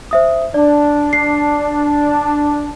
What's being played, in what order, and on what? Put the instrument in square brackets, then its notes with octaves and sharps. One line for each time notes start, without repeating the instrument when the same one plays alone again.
[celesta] C5 E5 D#6
[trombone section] D4 [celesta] D5
[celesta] C7